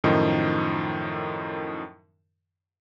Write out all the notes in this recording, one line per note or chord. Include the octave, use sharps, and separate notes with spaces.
F#2 A2 D#3 F3 D#4